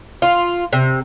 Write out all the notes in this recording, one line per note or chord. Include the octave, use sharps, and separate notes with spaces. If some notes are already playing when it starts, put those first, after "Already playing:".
F4
C3